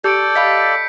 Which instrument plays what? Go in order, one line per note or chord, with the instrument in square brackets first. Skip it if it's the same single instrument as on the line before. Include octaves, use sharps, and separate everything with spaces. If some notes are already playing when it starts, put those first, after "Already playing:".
[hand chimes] G4 [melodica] A4 D5 [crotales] G6 C#7 D7
[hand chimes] D#5 F5 B5 [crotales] B6